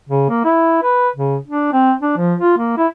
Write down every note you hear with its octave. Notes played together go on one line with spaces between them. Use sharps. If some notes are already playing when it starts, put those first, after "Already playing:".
C#3
A#3
E4
B4
C#3
D4
C4
D4
F3
F4
A#3
E4